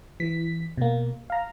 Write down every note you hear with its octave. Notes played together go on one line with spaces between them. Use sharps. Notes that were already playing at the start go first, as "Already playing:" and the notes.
E3 B6
B2 A#3
F5 A#5